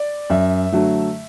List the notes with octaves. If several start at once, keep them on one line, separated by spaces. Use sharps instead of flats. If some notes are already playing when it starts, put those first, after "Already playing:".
Already playing: D5
F#2 E5
D3 F#3 A3